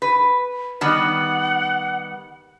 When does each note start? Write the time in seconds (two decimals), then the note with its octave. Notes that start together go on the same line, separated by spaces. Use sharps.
0.02 B4
0.81 D#3 G3 B3 F#5